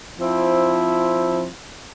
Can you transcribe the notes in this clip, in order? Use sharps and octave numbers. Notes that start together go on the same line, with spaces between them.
F3 C4 E4